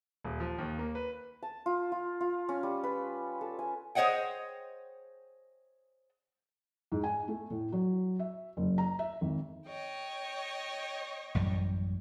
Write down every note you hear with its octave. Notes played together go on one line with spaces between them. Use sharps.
D#1
F3
D#2
A#3
B4
A5
F4
F4
F4
C#4
G3
B4
A4
G#5
G#4 C5 C#5 D#5 F#5 G5
G#2
G#5
A3
A2
F#3
E5
F#1
A#5
E5
G#1
C#5 D#5 G5
A1 F#2 G3